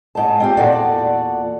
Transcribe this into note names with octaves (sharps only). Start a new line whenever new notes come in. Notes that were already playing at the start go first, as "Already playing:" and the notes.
G#2 A5
C4 F4 G4
E2 A#2 F#4 A4 D5